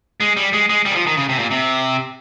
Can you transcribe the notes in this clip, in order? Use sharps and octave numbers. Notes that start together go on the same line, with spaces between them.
G#3
G3
G#3
G#3
G3
D#3
F3
D#3
C#3
C3
A#2
C3